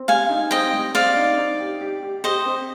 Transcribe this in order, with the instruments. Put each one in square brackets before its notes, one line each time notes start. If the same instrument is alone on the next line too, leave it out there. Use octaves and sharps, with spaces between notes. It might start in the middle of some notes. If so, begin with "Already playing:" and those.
Already playing: [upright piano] C4
[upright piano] G3 [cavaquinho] F5 G#5
[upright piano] D#4
[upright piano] C4 [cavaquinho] D#5 G5
[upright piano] G3
[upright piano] C4 [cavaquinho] D5 F5
[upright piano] D#4
D#4
G4
G4
G4
[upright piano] G4 [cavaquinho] C5 D#5
[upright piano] C4